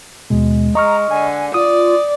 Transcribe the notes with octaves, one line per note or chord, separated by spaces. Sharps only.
D#2 B2 G#3
G#3 D#5 A#5 C#6 F6
D3 G#5
F4 D5 D#6